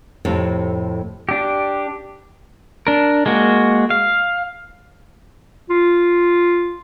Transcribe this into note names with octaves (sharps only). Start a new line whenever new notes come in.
F2 A2 C3
D4 G4
D4 A#4
G#3 A#3 F#4
F5
F4